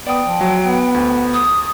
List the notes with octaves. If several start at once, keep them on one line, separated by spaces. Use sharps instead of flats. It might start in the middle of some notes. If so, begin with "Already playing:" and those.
B3 D5 G5 D#6
F3
F#3
B3
D2
D#6